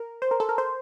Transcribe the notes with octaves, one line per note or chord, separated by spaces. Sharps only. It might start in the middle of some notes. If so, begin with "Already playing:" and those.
Already playing: A#4
C5
A#4
A4
A#4
C5